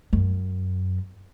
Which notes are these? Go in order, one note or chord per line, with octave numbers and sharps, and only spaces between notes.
F#2